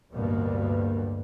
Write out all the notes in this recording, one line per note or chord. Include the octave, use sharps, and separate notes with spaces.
A1 D2 G2 B2 G3 A#3